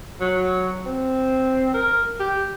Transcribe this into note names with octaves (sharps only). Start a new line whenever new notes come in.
F#3
C4
A#4
G4